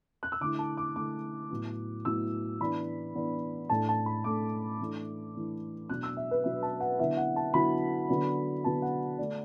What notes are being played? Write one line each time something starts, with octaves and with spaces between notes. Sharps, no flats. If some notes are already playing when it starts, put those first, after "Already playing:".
F#6
E6
D3 A3 E4 D6
A5
D6
D3 A3 E4 D6
A2 F#3 B3 E4
A2 F#3 B3 E4 E6
E3 B3 D4 B5
E3 B3 D4
A2 A3 D4 A5
A5
B5
A2 A3 D4 D6
E3 A3 D4
E3 A3 D4
B2 F#3 D4 F#6
E6
E5
B4
B2 F#3 D4 E5
A5
F#5
D3 F#3 B3 E4 E5
F#5
A5
D3 F#3 B3 E4 B5
D3 F#3 B3 D4
D3 F#3 B3 D4 A5
F#5
D3 A3 D4 D5